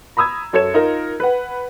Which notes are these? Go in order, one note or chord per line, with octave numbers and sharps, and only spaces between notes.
A#5 B5 D#6 E6 G#6
F#2 A4 C#5 G#6 C#7 E7
D#4 F4 A#4
B4 F#5